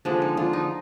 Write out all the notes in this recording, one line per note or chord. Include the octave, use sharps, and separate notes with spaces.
D3 F3 G#3 D4
D#4
D4 F4
D#4